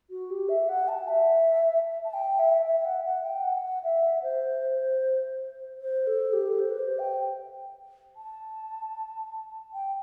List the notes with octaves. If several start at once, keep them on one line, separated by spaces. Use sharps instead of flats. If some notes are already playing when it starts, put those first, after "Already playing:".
F#4
G4
E5
F#5
A5
E5
A5
G5
E5
E5
F#5
F#5
G5
F#5
E5
C5
C5
A4
G4
C5
B4
C5
G5
A5
G5